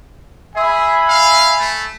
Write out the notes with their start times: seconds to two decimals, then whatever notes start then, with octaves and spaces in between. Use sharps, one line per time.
0.56 G#4 E5 G#5 B5
1.08 F5
1.59 A3